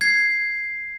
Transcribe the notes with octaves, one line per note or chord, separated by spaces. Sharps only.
G#6 C7